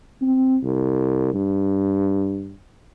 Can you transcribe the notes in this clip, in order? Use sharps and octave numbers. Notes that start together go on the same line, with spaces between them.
C4
C2
G2